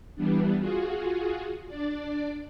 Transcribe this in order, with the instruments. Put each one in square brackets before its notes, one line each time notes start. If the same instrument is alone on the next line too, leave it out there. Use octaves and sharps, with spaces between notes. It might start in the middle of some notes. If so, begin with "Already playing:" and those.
[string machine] E3 G3 B3 D4
F4 F#4 G#4
D4 D5